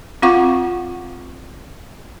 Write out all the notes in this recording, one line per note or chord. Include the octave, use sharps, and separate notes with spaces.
C4 F4 F5 F#5 C#6 D6